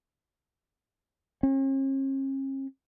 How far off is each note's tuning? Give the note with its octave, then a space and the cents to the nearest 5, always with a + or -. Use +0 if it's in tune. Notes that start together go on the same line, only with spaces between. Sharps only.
C#4 -45